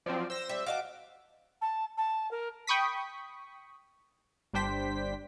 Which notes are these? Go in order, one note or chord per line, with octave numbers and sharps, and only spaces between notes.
F3 F#3 C4 D5
C5 E6 A#6
G3 E5
F#4 D#5 F5 A5 D6
A5
A5
A#4
G5 B5 C#6 D#6 B6
G1 G3 D4 C5 G5 B6